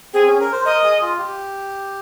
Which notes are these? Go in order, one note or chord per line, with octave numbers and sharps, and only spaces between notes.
C4 G#4
C#4
A#4
C5
A#4 D#5
G#4
F4
G4